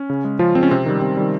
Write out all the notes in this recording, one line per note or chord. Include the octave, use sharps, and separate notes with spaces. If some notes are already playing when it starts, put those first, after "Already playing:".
Already playing: C#4
C#3
G#3
C#3 F3 F4
G#3 C4
C#4
C3 C4
D#3 G3
C3
D#3 G3